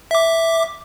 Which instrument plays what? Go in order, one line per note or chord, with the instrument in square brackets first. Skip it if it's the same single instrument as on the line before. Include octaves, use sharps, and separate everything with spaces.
[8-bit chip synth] E5 D6